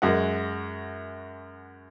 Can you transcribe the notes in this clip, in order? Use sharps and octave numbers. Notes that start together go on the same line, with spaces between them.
F#2 G#3 F#4 F#5